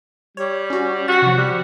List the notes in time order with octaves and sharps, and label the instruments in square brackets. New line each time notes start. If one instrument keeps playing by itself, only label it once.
[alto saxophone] G3 [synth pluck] C#5
[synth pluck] C#4 F#4
[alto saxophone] F#4 [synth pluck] A6 B6
[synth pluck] C3 F3
[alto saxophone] G3